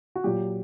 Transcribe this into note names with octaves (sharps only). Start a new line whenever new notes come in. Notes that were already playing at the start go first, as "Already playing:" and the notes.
F#4
A#2 F#3 G4